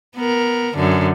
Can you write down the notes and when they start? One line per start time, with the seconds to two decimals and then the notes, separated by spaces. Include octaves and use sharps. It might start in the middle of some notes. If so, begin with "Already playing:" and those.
0.16 B3 A#4
0.75 F#2 D3